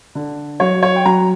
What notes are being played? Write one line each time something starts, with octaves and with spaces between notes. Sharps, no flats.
D3
F#3 C#5
C#5
G5
F#3 A#5